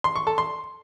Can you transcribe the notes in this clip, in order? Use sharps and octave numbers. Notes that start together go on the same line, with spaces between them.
C6
C#6
A4
C6